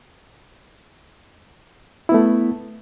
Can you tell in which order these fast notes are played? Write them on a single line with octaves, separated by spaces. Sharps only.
E4 B3 A3